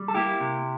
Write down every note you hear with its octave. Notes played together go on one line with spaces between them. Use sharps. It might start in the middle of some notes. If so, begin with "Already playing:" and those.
Already playing: G3
A4
A#3 E4 G4
C3